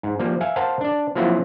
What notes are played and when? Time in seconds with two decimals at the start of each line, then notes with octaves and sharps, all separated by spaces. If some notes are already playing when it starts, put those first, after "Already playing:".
0.03 G#2
0.19 F3 G3 A#3
0.41 E5 F5 G#5
0.56 A#4 C5 F5 F#5 A5
0.81 D4 D5
1.15 F3 F#3 A#3 C4 E4 F4